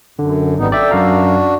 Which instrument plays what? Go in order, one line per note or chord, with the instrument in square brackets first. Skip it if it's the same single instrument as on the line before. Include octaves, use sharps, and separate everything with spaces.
[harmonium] F#2 [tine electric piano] D3
[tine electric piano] G#1 [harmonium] G3 B3 D#4
[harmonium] A4 G5 [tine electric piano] D5 E5
[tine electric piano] F#2 F5 A#5 [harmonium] D4 F#4